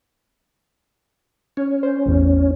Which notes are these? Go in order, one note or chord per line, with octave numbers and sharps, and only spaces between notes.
C#4 C#5
C5
A1 E2